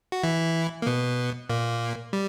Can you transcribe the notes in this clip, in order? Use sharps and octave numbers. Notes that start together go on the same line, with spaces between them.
F#4
E3 E4
A#3
B2 B3
A#2 A#3
G3